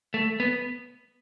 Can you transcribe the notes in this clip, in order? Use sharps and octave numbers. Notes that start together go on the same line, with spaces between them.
A3
B3